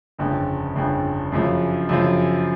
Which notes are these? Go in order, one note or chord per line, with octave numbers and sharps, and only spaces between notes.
G1 F2 C#3
G1 F2 C#3
F#2 C#3 F3
F#2 C#3 F3